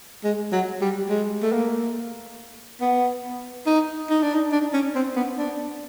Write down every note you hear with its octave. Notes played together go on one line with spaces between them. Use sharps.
G#3
F#3
G3
G#3
A3
A#3
B3
D#4
D#4
D4
D#4
D4
C#4
C4
B3
D4